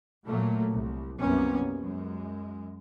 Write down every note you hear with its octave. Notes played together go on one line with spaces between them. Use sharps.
A#2 F#3 A3 A#3
C2
C2 F#2 C3 A#3 B3 C#4
F#2 G#3